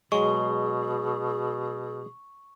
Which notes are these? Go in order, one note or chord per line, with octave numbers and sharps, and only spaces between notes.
B2 F#3 G#3 G#4 C#6